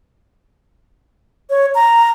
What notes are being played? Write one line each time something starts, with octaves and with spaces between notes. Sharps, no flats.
C#5
A#5